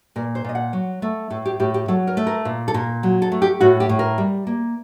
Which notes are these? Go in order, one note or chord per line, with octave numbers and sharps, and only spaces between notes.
A#2 A#4
C5
A#2 D#5
F#5
F#3
A3
A2 A4
G4
A2 G4
G4
F#3 A4
A#4
A3
A#4
A#2
A4
A#2 A#4
F#3
A4
A3
G4
A2 F#4
G4
A2
A#4
G3
A#3